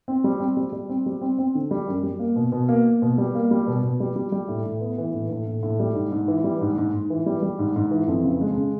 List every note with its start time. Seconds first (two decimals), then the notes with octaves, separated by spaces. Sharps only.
0.08 C4
0.24 G3
0.40 C4
0.57 G3
0.73 G3
0.89 C4
1.06 G3
1.22 C4
1.39 C4
1.55 D3
1.71 G3
1.88 F#2
2.03 G3
2.19 A#3
2.36 B2
2.52 B2
2.69 A#3
2.85 A#3
3.02 B2
3.18 G3
3.35 A#3
3.51 G3
3.67 B2
3.83 B2
4.00 G3
4.16 G3
4.32 G3
4.48 A2
4.65 A2
4.81 B3
4.98 E3
5.14 A2
5.30 A2
5.46 A2
5.63 A2
5.80 G3
5.95 G#2
6.12 G#2
6.28 E3
6.44 G3
6.61 G#2
6.78 G#2
6.93 G#2
7.10 E3
7.26 G3
7.42 G3
7.59 G#2
7.76 G#2
7.91 E3
8.08 F2
8.24 C#3
8.41 G#3
8.57 C#3